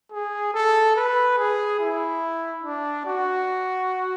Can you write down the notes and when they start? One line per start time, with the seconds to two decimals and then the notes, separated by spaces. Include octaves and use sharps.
0.12 G#4
0.54 A4
0.96 B4
1.38 G#4
1.80 E4
2.64 D4
3.05 F#4